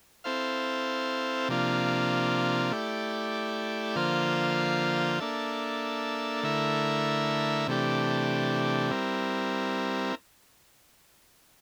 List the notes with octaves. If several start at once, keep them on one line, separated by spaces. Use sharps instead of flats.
C4 E4 A4 C5 F5
C3 F3 A#3 D4 F4
A3 E4 G4 D5
D3 F3 A#3 F4 C5
A#3 D4 A4 E5
D3 A3 E4 A#4 E5
C3 E3 A3 D4 G4
G3 C4 E4 A#4